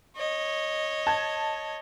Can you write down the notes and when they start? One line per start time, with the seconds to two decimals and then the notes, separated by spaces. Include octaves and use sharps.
0.17 C#5 D#5
1.07 A5 G#6